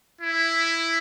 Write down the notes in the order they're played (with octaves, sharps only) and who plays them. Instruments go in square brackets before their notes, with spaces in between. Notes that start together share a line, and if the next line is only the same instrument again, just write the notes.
[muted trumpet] E4